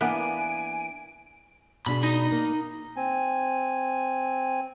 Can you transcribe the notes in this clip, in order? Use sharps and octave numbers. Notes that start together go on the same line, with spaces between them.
E3 A#3 B3 D4 G#5 D7
B2 D4 G#4 B5
D#4
A#3
C4 G#5